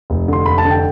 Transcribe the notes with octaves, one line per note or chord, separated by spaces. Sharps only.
F1
D3 C6
F1 B5
A5
D3
G5